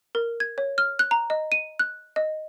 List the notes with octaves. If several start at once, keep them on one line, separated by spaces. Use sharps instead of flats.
A#4
G#6
C#5
F6
F#6
A#5
D#5
D#7
F#6
D#5